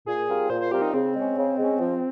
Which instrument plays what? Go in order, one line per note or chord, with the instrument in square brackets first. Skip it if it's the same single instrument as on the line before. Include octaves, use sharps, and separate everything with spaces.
[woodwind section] A#2 [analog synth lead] G#4
[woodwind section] G3 C4 F4 A#4
[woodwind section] A#2 [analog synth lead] C5
[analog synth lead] C5
[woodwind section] G3 C4 F4 A#4 [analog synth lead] G4
[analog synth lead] D#4
[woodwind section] C#3 [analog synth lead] C4
[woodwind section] G#3 C#4
C#3
G#3 C#4
F3